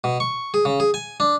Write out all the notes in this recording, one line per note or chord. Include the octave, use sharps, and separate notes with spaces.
B2
C#6
G#4
C#3
G#4
G#5
D4